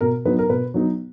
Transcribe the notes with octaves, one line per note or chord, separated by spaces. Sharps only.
B2 A#4
F#3 B3 D#4 B4
A#4
B2 B4
F#3 B3 D#4